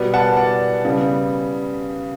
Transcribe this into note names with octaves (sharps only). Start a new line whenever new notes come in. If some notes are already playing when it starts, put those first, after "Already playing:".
Already playing: B2 G3 B3
F#5 A5
D5 F#5
C#3 G3 B3